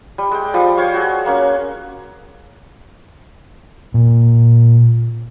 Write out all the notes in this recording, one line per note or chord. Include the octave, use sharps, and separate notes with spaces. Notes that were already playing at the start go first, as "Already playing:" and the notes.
G3
G#3 G5
F3 G3
C5 C#5 F5 C#6
F#4 G#4
A#3 C#4 C#6
A#2